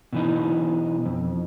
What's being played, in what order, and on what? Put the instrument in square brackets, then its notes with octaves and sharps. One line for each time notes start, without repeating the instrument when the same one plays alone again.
[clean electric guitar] B2 E3 D#4
F2